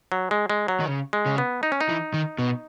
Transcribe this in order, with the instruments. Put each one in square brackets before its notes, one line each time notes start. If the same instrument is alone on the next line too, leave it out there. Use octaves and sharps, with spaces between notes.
[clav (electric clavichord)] F#3
G#3
G#3
F#3
[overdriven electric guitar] D#3
C#3
[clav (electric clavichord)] G#3
[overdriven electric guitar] C#3
[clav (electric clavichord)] B3
D#4
C#4
D#4
[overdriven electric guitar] E3
D#3
B2